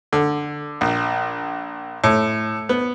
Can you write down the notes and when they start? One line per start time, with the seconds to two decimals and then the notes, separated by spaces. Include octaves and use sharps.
0.13 D3
0.81 A#1
2.04 A2
2.69 B3